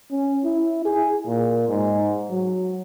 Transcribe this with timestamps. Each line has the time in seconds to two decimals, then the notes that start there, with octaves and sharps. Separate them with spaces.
0.11 C#4
0.44 E4
0.85 G#4
1.26 A#2
1.69 G#2
2.30 F#3